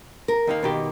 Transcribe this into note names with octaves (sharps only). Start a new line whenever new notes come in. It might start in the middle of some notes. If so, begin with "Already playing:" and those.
A#4
D#2 D#3 A#3
B2 D#3 G4